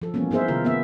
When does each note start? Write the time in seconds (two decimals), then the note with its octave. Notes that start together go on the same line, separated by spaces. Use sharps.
0.02 F3 A4
0.14 E3 F3 G3 A#3 B3 C#4
0.31 B3 D#4 G#4 A#4 C5 E5
0.48 C3 D#3 F4 A#4
0.65 A#3 B3 E5